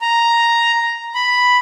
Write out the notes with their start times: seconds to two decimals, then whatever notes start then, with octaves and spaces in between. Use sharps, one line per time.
0.01 A#5
1.15 B5